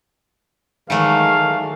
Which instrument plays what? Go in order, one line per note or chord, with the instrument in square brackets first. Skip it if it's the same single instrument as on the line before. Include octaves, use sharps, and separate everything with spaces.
[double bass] D#3 G#3 [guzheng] E3 F#3 A3 [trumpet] F5